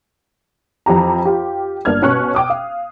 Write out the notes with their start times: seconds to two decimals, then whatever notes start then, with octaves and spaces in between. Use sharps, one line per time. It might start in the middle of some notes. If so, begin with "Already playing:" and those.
0.86 F2 E3 G4 A#5
1.25 F4 G4
1.85 G1 A#3 D4 F6 G#6
2.02 B2 C#4 C#6 F#6
2.35 G5 D6 D#6
2.50 F5